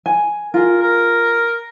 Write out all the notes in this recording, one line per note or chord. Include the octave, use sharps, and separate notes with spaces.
G#5
F4 G#4 A#4
A#4